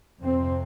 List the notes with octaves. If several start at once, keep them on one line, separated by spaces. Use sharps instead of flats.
F2 C3 C4